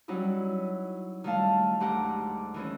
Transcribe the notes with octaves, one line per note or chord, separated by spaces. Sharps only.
F#3 G3 C#4 D#4 E4
D#3 G3 A3 D#4 F5 A5
D2 G#2 G4 F#5 A#5 D6
D#3 E3 C#4